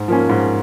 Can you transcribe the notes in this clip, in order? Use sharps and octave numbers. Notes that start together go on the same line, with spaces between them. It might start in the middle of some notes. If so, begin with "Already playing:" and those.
Already playing: G#2
F3 A#3 C#4
G#2